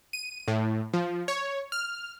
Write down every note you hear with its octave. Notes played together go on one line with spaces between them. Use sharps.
D#7
A2
F3
C#5
F6